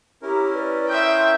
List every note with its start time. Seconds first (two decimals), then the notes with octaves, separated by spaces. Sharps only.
0.22 C#4 E4 G4 A#4 A#5
0.54 B4 D5
0.89 E5 G5 C6 D#6 G6